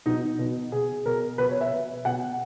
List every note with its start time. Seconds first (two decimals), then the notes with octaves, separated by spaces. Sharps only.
0.06 B2 D#4
0.39 B2
0.72 B2 G#4
1.05 B2 A#4
1.38 B2 B4
1.50 C#5
1.61 E5
1.72 B2
2.05 B2 F#5